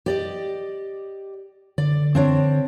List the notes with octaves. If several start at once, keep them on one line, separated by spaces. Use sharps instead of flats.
G4 D5 D#5
D3 D5
C4 D4 C#5